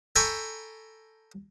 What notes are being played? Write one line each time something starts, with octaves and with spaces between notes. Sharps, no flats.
A4 G5 G#5 A#5 B5 C#6